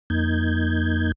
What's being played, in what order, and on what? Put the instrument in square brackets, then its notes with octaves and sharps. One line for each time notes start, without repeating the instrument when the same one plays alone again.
[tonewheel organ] F2 A#3 D#4 G6 G#6